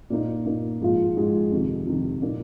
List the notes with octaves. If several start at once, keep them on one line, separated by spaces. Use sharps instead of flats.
A#2 A#3 D#4
A#2 A#3 D#4
G#2 F3 G#3 F4
G#2 F3 G#3 F4
F2 C3 D#3
F2 C3 D#3
A#2 A#3 D#4